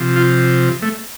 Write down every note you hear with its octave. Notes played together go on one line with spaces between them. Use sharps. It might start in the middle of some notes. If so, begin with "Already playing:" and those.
Already playing: C3 F3
F4
A3